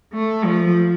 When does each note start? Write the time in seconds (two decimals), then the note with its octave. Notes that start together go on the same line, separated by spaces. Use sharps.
0.13 A3
0.44 F3